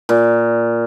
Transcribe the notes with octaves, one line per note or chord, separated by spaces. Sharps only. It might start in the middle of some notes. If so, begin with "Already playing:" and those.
A#2